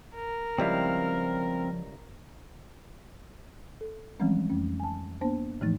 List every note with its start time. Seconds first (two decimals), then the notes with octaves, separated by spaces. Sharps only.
0.15 A#4
0.58 C#2 F3 G3 C4 E4 F5
3.81 A4
4.20 E3 F3 G3 G#3 C4 C#4
4.49 F2 A3 C#4
4.80 G#5 A5
5.21 A#3 B3 D4 C5 A5
5.61 A2 E3 F3 A3 D#4 A6